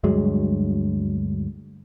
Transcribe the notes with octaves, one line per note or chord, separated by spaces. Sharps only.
D2 G2 F#3 G#3